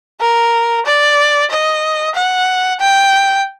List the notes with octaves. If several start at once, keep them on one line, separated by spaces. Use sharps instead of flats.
A#4
D5
D#5
F#5
G5